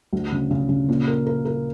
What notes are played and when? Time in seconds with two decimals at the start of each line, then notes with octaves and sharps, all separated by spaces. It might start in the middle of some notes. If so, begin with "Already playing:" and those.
0.13 D2
0.32 C#3
0.51 C#3
0.69 C#3
0.89 A#2
1.08 A#4
1.27 A#4
1.45 A#4